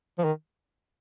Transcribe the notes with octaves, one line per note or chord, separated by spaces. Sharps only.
F3
D#3